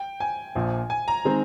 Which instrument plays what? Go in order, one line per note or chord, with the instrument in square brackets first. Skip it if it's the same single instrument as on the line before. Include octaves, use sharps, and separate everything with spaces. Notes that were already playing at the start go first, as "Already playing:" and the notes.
Already playing: [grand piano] G5
G#5
[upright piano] A#1 A#2 F3
[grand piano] G#5
A#5
[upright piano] D#3 G#3 C4